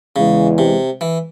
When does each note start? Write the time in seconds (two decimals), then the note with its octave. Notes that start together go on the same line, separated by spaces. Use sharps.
0.16 E2 C#3 E3 G#3
0.58 C3
1.01 E3